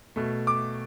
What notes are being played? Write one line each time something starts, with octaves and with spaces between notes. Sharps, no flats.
B2 A3
D6